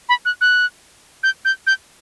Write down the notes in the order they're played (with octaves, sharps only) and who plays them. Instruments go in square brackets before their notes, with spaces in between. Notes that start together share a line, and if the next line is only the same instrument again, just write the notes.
[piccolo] B5
F#6
F#6
G6
G6
G6